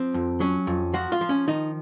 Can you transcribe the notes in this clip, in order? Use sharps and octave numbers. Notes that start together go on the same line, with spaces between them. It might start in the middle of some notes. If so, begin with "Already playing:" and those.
Already playing: F3 C4
F2
F#3 C#4
F2
F3 F#4
F4
F3
C#4
D#3 D#4